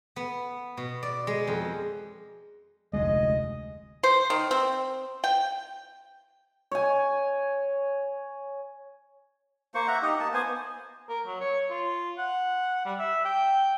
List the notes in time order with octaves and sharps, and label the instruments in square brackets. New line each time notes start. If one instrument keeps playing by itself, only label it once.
[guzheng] B3
B2
D5
G#3
F2
[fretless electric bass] F1 D2 G#3 [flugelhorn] D#5
[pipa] C5
D#3
C4
G5
[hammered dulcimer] C#5 G#5
[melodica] A#3 C5 C#6
E5 F#5 A#5
D#4 G4 D#5
A#3 A5
B3 C5 G#5
[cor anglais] A#4
F#3
C#5
F4
F#5
G3
E5
G5